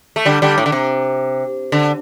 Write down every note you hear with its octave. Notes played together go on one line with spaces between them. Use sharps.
A3
D3 G3
D3 G3
A2
D3
C3
D3